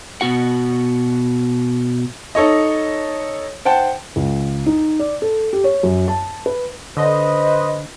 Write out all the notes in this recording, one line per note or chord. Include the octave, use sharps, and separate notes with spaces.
B2 F#4 F#5
D#4 A4 C#5 D#5
C5 F#5 G5 A5
C#2
D#4
D5
A4
G4
C#5
F#2
A5
B4
D3 B4 C5 D#5